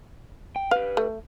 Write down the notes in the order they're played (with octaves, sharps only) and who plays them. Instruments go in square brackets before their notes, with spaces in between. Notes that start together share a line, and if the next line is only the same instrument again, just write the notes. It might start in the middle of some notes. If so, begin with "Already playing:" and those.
[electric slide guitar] G5
[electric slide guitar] G4 B4 [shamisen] F5
[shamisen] A3